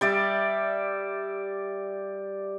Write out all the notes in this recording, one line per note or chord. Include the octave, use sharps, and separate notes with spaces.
G3 D5 E5